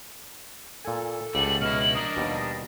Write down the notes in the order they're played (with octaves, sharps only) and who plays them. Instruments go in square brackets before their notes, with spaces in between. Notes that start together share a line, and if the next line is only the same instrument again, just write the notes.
[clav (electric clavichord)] A#2 G#5 [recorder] A4
[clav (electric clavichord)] C#2 F#5 [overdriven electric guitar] G3 A3 [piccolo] F#7
[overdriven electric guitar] B2 E4 [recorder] D#5 [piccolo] F6
[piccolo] F#7
[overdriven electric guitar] D4 A#4 [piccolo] D#6
[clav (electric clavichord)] D#2 B2 G3